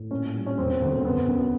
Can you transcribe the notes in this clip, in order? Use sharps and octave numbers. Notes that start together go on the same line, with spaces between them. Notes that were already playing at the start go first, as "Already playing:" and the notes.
Already playing: A2
A#2 C#4
G3
C#4
E1 C4
D2
C4
F#1 B3
F#2